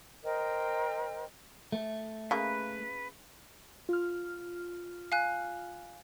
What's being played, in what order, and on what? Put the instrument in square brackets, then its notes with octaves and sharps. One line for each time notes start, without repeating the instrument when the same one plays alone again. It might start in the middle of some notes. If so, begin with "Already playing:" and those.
[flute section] A#4 C5 D#5 G5
[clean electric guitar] A3
[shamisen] C#3 A#3 [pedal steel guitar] B4
[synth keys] F4 F6
[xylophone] F5 G#5 F#6